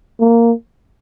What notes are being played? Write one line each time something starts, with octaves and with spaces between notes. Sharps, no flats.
A#3